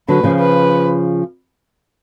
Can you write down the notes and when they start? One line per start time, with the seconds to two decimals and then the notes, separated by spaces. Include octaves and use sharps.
0.08 D3 F#3 B4
0.23 C#3 F3
0.39 B4